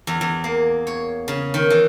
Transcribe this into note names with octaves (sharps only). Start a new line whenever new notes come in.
E2
E2
A#3
C#5
C#3
D#3
E3